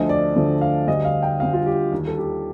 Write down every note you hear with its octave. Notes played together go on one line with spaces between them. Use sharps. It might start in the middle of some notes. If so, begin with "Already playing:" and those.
Already playing: D2 D3 F3 A3 D#5
D5
D2 D3 F3 A3
F5
D2 D3 G3 D#5
F5
G5
D2 D3 G3 F5
F4
G4
D#2 D#3 G3
A4
G4